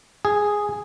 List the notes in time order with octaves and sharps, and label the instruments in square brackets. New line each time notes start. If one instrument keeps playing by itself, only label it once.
[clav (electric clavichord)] G#4